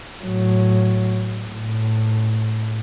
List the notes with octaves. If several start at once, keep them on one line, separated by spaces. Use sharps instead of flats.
A2 F#3
A2